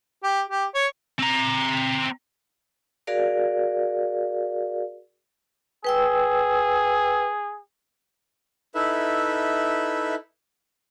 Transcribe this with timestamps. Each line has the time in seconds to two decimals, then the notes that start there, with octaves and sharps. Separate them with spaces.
0.23 G4
0.50 G4
0.75 C#5
1.19 C4 A#5
3.07 F#4 G#4 A#4 D5 F5
5.84 G#4 B4 G5 E6
8.75 D#4 E4 A4 B4 E5